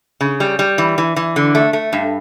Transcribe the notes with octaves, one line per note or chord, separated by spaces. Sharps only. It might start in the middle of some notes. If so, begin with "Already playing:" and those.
C#3
G3
G3
E3
E3
E3
D3
A3
A3
G2